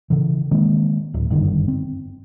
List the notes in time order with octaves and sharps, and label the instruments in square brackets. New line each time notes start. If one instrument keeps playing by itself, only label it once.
[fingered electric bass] C#3 E3
D#3 G#3 A#3 C4
D1
F#1 G2 D3 D#3
C4